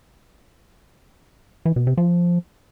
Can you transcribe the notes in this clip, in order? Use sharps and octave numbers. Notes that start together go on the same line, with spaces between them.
E3
B2
C3
F3